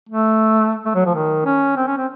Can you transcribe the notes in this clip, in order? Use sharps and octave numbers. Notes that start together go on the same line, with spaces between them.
A3
A3
F#3
F3
D#3
C#4
C4
C#4
C4